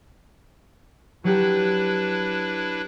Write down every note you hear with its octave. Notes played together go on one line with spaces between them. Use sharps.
F#3 D4 E4 G4 B4